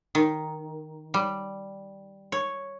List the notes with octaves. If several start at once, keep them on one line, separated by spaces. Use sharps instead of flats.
D#3
G3
C#5